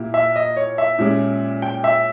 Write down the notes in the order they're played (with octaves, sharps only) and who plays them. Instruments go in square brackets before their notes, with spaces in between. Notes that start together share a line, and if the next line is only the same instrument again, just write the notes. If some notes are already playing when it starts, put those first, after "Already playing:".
Already playing: [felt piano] A#2 A#3 E4 G4
[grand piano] E5
D#5
C#5
E5
[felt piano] A#2 G#3 C#4 G4
[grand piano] G5
E5